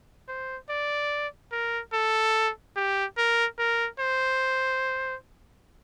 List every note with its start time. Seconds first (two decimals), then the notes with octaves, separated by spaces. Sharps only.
0.28 C5
0.70 D5
1.52 A#4
1.93 A4
2.76 G4
3.17 A#4
3.59 A#4
4.00 C5